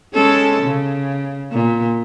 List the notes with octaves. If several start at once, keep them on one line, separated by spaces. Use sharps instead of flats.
G#3 C#4 A4
C#3
A#2